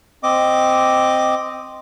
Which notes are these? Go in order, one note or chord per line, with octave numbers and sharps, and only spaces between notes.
C4 D#5 D6